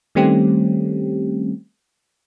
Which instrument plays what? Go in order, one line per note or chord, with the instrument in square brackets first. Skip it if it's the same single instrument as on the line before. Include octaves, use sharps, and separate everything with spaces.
[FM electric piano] D#3 G3 A3 C4 C#4 G4